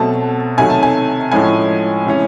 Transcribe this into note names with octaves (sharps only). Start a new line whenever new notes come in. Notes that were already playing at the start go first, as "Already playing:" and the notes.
Already playing: B2 F#3 A3 C4 A5
C3 D#3 F#3 A3 G#5
A5
G#5
A2 F3 G#3 C#4 G#5
C3 E3 G#3 C#4